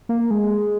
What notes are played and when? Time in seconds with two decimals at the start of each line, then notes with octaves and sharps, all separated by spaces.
0.09 A#3
0.31 G#3